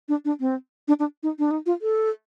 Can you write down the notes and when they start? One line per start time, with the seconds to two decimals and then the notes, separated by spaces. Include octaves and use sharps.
0.09 D4
0.25 D4
0.40 C4
0.88 D4
0.99 D4
1.23 D#4
1.39 D4
1.51 D#4
1.66 F4
1.82 A4